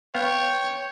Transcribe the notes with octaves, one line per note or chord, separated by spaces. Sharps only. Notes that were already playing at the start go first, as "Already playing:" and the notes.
B3 C#5 F5 G5